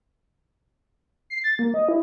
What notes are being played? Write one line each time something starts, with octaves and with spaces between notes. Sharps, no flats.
C7
A6
A#3
D#5
E4